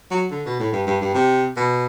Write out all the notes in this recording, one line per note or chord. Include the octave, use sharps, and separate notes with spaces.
F#3
D3
B2
A2
G2
G2
G2
C3
B2